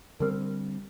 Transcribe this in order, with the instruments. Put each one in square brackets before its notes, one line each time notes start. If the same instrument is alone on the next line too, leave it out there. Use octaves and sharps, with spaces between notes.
[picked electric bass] D3 G3 C4 [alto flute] A#4